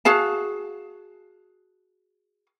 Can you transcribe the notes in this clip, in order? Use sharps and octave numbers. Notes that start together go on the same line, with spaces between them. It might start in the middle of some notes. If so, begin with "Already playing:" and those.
F#4 G#4 F5 A5